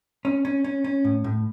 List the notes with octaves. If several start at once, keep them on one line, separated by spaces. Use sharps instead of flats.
C#4
C#4
C#4
C#4
A2
A2